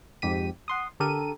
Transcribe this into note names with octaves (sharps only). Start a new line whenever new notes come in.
F2 G#2 G4 B6 D#7
F#5 C6 D#6
D3 G4 A4 A#4 D#7